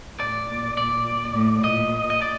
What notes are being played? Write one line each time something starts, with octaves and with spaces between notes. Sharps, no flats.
A2 D5
A#2
A#2 D5
A2
A#2 D#5
D#5
D5